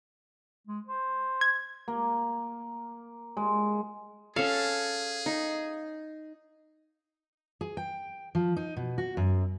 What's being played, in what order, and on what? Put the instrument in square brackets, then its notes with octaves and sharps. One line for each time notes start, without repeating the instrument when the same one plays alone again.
[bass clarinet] G#3
C5
[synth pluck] G#6
[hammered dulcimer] A#3
G#3
[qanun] C#4 A4 [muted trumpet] G#4 [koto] F5
[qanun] D#4
[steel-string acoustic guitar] G#4
G5
F3
D#4
B2
F#4
F#2